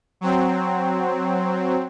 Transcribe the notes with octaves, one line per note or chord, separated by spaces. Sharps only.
F#3 C4